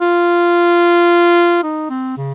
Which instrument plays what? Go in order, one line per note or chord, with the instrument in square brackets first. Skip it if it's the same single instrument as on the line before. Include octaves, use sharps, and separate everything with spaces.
[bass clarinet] F4
D#4
C4
C#3